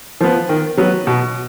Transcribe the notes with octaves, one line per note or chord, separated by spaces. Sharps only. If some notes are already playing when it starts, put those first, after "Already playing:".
F3 B3
D#3
F#3 B3
B2